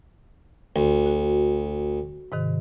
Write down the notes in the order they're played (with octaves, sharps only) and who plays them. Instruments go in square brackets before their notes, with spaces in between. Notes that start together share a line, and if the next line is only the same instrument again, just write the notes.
[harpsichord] D2
[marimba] F#4
G#2 C3 D#3